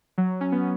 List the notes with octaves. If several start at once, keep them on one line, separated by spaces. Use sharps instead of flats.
F#3
C#4
B3